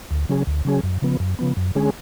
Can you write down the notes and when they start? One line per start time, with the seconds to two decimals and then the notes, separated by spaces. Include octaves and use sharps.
0.11 D2
0.29 C#3 F#3 C#4 G#4
0.47 D2
0.65 C#3 F#3 C#4 G#4
0.83 F#2
1.02 C#3 F3 B3
1.20 F#2
1.39 C#3 F3 B3
1.57 F#2
1.75 D3 G#3 C#4 G#4